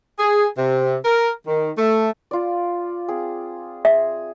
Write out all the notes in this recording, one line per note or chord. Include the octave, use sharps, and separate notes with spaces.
G#4
C3
A#4
D#3
A3
F4 D5
C4 G#4
G#4 E5